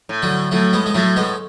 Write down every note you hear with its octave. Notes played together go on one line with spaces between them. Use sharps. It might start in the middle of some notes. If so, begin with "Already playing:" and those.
A2
D3 F#3
A2 F#3 A3
G#3 B3
G#3
A2 F#3 A3
G#3 B3